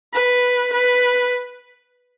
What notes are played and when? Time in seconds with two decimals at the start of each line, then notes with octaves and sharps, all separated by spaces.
0.13 B4
0.73 B4